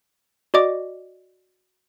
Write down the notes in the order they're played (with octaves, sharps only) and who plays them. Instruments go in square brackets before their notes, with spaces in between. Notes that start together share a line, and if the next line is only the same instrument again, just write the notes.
[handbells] F#4 D5 D#5 D6